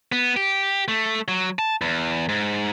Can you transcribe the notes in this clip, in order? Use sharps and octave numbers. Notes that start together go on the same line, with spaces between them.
B3
G4
A3
F#3
A5
E2
G#2